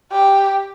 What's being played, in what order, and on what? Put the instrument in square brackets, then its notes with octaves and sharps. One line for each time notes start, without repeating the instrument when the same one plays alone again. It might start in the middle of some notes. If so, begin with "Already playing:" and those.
[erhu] G4